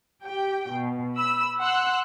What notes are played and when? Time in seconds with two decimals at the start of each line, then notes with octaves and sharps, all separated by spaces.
0.25 G4 G5
0.71 B2
1.16 B5 E6
1.60 F#5 C6 E6 F#6